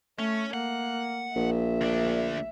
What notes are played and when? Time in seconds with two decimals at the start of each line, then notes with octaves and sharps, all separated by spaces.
0.19 A3 C#4
0.54 A#3 F#5
1.36 A#1 E5
1.81 D2 D4